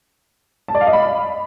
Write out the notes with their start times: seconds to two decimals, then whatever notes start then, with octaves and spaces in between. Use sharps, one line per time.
0.68 A5
0.75 D5
0.81 F5
0.87 D#5
0.93 B5